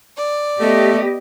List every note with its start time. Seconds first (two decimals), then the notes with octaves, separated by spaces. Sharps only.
0.17 D5
0.60 A3 B3 G4 D#5